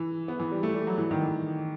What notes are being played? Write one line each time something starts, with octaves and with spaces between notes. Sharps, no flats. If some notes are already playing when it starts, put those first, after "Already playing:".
Already playing: E3
B3
E3
G3
A3
G3
F#3
E3
D#3
E3